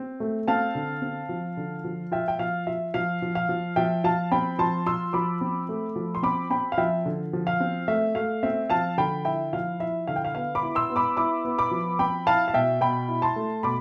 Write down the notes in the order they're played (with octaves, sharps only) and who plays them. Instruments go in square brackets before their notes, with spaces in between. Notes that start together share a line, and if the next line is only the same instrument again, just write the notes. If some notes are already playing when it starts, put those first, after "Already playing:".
Already playing: [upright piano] C4
A3
C4 F5 A5
D3
C4
F3
D3
F3
F4 E5 G5
G5
F3 F5
F4 E5
F3 F5
F3
F5
F3
F3 E5 G5
F3 F5 A5
C4 G5 B5
F3 A5 C6
F4 C6 E6
F3 B5 D6
C4
A3
F3
C6
C4 B5 D6
C4 G5 B5
F5
F3 E5 G5
D3
F3
F5
C4
A3 E5
A3 F5
C4 E5
F3 F5 A5
D3 G5 B5
E4 E5 G5
F3 F5
E4 E5
D3 F5
G5
F5
B3 F5
B5 D6
E4
C6 E6
B3
B5 D6
E4 B5 D6
B3
B5 D6
F3
C4 G5 B5
E4 F5 A5
F5
B2 E5 G5
B2 G5 B5
E4
A5 C6
A3
B2 B5 D6